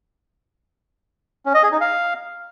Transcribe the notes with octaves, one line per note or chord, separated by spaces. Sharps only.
C#4
D#5
G#4
D#4
F5